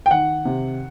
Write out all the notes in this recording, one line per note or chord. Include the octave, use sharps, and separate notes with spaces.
G5
D#3 F#5
C3